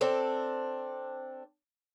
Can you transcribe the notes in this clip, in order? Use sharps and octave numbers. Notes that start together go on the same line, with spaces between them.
C4 D4 A4